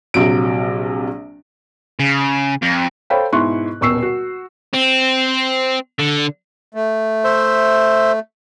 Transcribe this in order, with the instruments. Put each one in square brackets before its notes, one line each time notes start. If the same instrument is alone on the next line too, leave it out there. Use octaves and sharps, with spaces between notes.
[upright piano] A#1 C3 F#3 D7
[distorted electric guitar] C#3
F2
[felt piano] A4 C5 C#5 F5 G5 B5
G#2 B2 E4 C6 C#6 F#6
D#1 B2 C#6 E6 C7
F#4
[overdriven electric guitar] C4
D3
[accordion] A3
[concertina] C5 E5